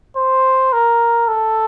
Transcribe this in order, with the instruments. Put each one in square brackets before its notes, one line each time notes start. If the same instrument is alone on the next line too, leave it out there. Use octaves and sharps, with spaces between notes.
[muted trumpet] C5
A#4
A4